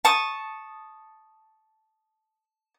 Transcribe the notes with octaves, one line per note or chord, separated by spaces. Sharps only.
A5 C#6 D#6